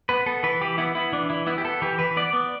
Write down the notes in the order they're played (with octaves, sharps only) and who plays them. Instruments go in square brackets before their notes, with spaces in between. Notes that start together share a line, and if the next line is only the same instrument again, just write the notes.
[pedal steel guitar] B3 B4
B3 A4
E3 B4
E3 G4
B3 E4
B3 E4
E3 D4
E3 E4
B3 E4
G4
B3 A4
E3 G4
E3 B4
B3 D5
B3